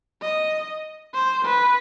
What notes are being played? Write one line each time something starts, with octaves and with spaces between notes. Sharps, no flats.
D#5
C5
B4